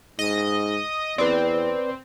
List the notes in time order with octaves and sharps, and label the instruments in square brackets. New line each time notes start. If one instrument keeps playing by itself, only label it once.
[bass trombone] G#2 [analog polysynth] D#5
[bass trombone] E2 [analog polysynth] C4 [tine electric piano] B4 D5